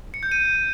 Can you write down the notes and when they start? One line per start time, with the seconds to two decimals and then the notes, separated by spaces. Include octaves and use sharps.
0.14 C#7
0.23 G6
0.32 D#7